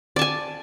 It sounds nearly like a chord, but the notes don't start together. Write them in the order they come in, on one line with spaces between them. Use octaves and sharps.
D5 A5 G#5